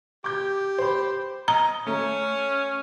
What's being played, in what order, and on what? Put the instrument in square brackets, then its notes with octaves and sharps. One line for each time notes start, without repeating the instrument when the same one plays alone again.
[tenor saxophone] G4 [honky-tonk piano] D6 G6
[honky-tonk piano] C5 B5
[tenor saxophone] D#5 [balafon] A#5
[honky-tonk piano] A3 [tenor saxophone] C#4